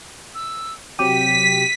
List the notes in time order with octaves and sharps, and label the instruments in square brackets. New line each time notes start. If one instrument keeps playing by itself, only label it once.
[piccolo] E6
[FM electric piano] C3 F#3 G4 [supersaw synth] B6 [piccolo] D#7